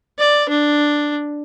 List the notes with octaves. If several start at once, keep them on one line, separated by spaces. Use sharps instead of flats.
D5
D4